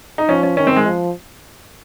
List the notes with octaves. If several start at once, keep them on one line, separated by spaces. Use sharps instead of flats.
D#4
F3 C#4
C#4
D#3 C#4
C4
G#3
F3